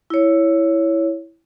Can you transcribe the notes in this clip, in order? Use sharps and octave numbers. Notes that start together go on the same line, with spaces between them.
E4 C#5